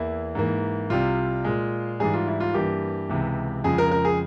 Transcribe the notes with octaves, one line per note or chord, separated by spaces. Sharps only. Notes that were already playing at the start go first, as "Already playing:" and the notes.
Already playing: E2 E3 A#3 E4
G#2 E3 A#3
C2 C3 G3 F4
A#2 G#3
G#2 E3 G3 G#4
F4
E4
F4
G2 E3 A#3 G4
C#2 C3 E3
F2 C#3 F3 G#3 G#4
A#4
A#4
G#4